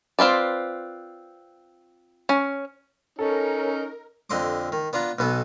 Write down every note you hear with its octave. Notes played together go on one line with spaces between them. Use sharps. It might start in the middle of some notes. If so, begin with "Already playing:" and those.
C4 F4 B4 D5
C#4
C#4 D#4 A4 A#4
F2 D3 D#5 C6 D6
D#3
B3 D4 F4 A#5
B1 B2 B3 A4